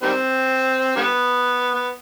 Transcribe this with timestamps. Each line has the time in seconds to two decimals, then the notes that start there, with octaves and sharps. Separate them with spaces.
0.03 D#3 G3 C4
0.96 D3 G3 B3
1.74 B3